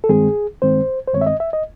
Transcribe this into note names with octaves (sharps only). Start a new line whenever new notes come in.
A4
G2 D#3 G#3 C4 G#4
G2 D#3 G#3 C4 C5
C5
G2 D#3 G#3 C4 C#5
E5
D#5
E5
D#5